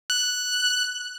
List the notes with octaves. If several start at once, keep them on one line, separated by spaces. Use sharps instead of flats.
F#6